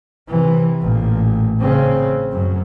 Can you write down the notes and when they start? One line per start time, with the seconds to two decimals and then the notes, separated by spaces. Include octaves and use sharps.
0.28 C3 E3
0.81 A1 A#2
1.60 C#3 C4
2.32 F#2